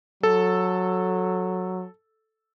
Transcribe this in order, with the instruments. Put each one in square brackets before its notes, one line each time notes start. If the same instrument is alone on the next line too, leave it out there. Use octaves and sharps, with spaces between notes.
[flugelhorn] F#3 [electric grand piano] A4